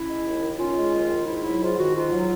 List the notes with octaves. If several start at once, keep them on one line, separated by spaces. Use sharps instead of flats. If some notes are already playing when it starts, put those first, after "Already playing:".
Already playing: C#4 E4
G#3
D#2
D#3
C#4 F4
G#3
D#2
D#3
G#2 E4
F#3 E4
G#2 F4
D#3 F#4
G#2 F4
F#3